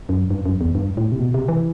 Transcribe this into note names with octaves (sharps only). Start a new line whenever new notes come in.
F#2
G2
F#2
E2
G2
A2
C3
B2
C3
E3